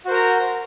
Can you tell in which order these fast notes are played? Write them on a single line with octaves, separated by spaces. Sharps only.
F#4 C5 A#4 A#5